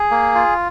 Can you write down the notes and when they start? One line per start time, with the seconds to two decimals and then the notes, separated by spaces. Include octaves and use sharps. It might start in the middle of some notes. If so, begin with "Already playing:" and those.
Already playing: G#4
0.11 A#3
0.35 F4